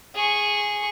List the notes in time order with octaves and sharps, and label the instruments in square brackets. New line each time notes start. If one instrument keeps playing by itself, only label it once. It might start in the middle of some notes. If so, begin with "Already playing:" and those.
[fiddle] G#4 C#6